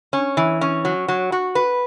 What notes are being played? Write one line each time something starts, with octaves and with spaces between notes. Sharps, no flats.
C#4
E3
C#4
F#3
F#3
F#4
B4